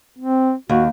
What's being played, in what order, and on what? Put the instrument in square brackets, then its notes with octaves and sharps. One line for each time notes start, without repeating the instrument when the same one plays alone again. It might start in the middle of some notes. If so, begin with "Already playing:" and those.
[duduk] C4
[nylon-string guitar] D#2 [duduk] F#4